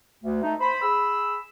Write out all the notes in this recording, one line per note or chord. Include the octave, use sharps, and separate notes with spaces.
D2
A3 D#4
C5 B5
G#4 B5 E6